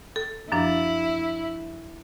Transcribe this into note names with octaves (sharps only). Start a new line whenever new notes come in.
A4
F#2 F3 D4 E4